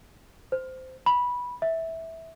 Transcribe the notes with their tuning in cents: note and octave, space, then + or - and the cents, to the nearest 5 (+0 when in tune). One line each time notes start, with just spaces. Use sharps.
C5 -15
B5 -15
E5 -15